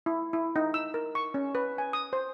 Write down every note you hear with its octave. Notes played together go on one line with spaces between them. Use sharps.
E4
E4
D#4
E6
A#4
C#6
C#4
B4
G#5
D#6
C5